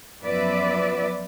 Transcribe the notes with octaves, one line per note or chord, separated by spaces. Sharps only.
F#2 F3 B3 B4 D5 E5